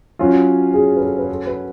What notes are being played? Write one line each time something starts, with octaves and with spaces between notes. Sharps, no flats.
F#3 C#4 F4 F#4
G#4
B4
A4
B4
A4
B4